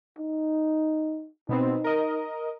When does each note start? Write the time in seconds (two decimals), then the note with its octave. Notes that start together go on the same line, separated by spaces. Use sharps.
0.18 D#4
1.49 B2 B3 C4 D#4
1.84 A#4 D#5